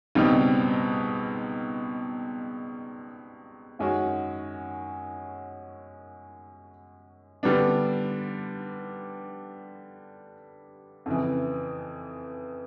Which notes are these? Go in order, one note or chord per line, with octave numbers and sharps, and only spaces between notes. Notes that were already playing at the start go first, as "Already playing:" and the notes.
C#2 B2 G3 C4 D#4
F#2 D#3 G#3 C#4 F#4
D3 G3 B3 D4
F2 C#3 E3